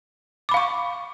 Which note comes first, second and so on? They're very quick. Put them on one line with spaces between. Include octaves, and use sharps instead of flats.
D6 B5 F5 C#6